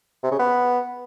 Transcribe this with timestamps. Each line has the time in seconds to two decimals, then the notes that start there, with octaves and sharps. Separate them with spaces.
0.24 C3
0.31 C#3
0.39 B3